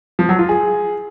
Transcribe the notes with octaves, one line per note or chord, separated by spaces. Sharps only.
F3
F#3
F4
G#4